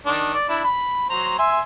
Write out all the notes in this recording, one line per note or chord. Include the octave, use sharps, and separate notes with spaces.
D#3 D4
D5
D4 E4
B5
F#3 C5 A#5
E5 G#5 C6